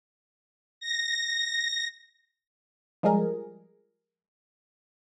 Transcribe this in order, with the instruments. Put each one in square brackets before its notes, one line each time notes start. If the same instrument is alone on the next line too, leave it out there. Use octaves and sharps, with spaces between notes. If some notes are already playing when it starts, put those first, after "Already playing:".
[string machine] A#6
[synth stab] F3 G3 G#3 G#4 A#4